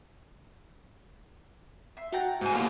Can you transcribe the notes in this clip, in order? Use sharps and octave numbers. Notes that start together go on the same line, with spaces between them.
E5 C6
F#4 F#5 G5 A5 A#5
G#2 G#5
A2 A#3 G4 F5